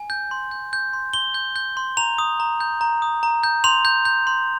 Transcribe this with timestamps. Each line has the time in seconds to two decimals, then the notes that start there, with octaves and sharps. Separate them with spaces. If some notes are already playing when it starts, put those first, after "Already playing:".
Already playing: G#5
0.10 G6
0.31 C6
0.51 G6
0.73 G6
0.93 C6
1.13 C6 G7
1.34 G6
1.56 G6
1.77 C6
1.97 A#5 F7
2.18 D#6
2.40 A#5
2.61 G6
2.81 A#5
3.02 D#6
3.23 A#5
3.43 G6
3.64 C6 F7
3.85 G6
4.05 G6
4.27 C6